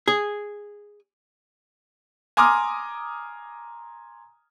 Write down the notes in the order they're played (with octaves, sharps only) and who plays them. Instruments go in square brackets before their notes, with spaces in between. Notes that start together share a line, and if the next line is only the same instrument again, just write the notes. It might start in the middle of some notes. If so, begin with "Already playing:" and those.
[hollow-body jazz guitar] G#4
[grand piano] G#5 A#5 C6 D6 D#6 F6